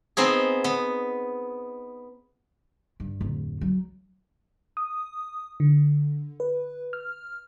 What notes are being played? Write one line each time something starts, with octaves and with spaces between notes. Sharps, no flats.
B3 C4 D#4 G#4
B3
G2
D1 F2
F#3
D#6
D3
B4
F6